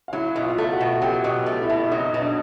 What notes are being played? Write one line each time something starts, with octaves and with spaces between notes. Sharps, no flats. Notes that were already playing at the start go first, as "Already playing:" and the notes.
F5
F#3 E4 E5
B2
F4 F5
A3
F#4 F#5
B2
F#3 G4 G5
B2
A3
E4 E5
B2
F#3 D#4 D#5
B2
D4 D5